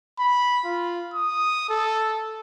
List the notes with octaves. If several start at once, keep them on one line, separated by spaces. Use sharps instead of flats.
B5
F4
D#6
A4